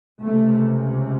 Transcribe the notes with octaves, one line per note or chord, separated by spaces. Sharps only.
C#2 C3 A3